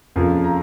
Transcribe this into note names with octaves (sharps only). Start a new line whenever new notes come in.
F2 C#3 F3 A#3
A#5